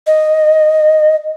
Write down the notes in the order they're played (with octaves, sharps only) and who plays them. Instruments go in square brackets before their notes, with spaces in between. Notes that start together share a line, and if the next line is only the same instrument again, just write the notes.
[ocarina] D#5